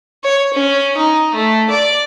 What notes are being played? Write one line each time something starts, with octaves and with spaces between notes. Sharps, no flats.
C#5
C#4
D#4
A3
D5